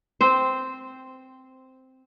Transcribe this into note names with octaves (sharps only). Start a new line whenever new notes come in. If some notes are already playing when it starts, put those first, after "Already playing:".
C4 C5